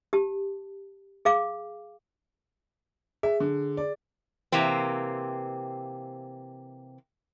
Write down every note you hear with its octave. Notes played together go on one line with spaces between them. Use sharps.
G4 A5
G#4 F5 D6
G#4 E5
D3
D5
C3 E3 A#3 C4